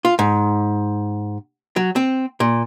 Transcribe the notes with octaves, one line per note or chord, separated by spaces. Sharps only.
F4
G#2
F#3
C4
A#2